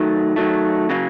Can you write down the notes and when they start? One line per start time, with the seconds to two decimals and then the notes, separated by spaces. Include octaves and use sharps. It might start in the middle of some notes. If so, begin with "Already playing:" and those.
Already playing: D#3 F#3 A3
0.36 D#3 F#3 A3
0.90 C#3 F#3 A#3